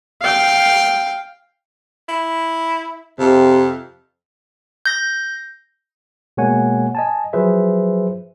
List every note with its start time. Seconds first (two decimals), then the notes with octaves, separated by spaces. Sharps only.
0.22 F5 G5
2.09 E4
3.19 F2 C3
4.86 G6 A#6
6.37 B2 G#3 A#3 C#5 F#5 G#5
6.95 D#5 G#5 A5
7.33 F3 F#3 G#4 B4 C5 E5